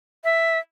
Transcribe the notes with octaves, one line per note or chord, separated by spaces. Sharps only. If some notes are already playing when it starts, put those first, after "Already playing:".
E5